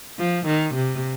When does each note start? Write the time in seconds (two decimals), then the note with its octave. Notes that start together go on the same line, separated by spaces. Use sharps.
0.19 F3
0.47 D#3
0.75 C3